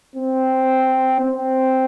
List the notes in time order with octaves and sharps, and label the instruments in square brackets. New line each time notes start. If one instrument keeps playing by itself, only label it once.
[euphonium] C4
C4